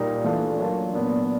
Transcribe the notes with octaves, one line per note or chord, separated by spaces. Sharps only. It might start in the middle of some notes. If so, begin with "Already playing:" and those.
Already playing: A#2 G3 A#3 D#4
E3 A3 D4 F4
F#3 A#3 D4 F4
A#2 F#3 B3 D4